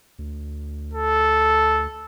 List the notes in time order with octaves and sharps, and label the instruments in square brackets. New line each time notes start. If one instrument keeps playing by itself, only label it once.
[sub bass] D2
[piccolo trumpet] A4